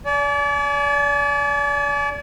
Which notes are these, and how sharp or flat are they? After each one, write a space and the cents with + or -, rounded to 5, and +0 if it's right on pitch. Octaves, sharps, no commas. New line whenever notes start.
D5 -35 G#5 +35